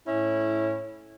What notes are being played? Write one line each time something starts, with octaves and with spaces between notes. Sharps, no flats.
A2 C#4 E4